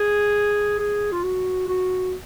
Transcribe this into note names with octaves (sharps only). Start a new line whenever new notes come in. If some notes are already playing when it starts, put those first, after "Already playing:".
Already playing: G#4
G#4
F4
F#4
F#4